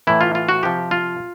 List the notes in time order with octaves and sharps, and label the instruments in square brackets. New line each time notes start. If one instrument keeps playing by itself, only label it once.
[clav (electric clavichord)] A2 E3 E4
F4
F4
F#4
C3 F3 G4
F4